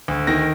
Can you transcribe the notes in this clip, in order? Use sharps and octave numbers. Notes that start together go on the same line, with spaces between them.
D2
D#3 A#6